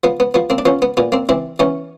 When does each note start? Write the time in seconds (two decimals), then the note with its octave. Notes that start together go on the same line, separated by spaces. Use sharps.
0.04 F3 B3
0.20 B3
0.34 F3 B3
0.50 A#3 C4
0.58 D4
0.66 F3 B3 C#4
0.82 B3
0.97 A#2 B3
1.12 A#3 C4
1.29 E3 C4 D4
1.59 E3 B3 C#4